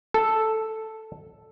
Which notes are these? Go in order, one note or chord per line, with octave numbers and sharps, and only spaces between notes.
A4